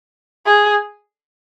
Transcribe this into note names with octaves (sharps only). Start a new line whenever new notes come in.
G#4